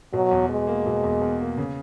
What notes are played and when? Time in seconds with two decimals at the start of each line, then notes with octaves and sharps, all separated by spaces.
0.14 B2 F#3
0.31 E2
0.49 E2 G#3
0.67 A#3
0.86 B2
1.04 E2
1.22 E2
1.40 A#3
1.58 C#3